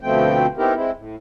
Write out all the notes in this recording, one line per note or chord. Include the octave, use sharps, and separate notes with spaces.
D2 B2 F3 A3 C4 G5
B3 C4 D#4 E4 G4 A#4
G#3 C4 E4
A2